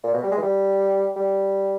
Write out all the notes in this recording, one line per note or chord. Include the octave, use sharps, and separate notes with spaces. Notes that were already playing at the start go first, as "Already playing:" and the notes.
A#2
B2
G3
G#3
E3
G3
G3